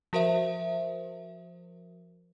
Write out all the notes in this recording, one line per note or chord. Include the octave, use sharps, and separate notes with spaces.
F3 F#4 A#4 C5 E5